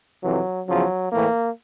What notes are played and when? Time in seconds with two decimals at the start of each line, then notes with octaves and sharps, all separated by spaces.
0.23 F2 C3 E3 F#3
0.67 E2 C#3 F3 F#3
1.11 A2 E3 A#3